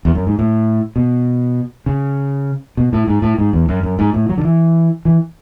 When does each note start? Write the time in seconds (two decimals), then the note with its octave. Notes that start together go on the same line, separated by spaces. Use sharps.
0.05 E2
0.15 F#2
0.27 G#2
0.39 A2
0.96 B2
1.86 C#3
2.77 B2
2.93 A2
3.08 G#2
3.22 A2
3.38 G#2
3.53 E2
3.69 F#2
3.83 F#2
3.99 G#2
4.14 A2
4.29 F#3
4.38 D3
4.45 E3
5.05 E3